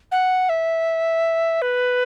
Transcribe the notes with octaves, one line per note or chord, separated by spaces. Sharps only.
F#5
E5
B4